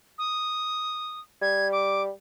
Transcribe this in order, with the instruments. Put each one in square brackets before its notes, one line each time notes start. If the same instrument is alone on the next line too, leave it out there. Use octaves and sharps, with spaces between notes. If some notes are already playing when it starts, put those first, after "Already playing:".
[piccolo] D#6
[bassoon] G3 [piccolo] G#6
[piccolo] D6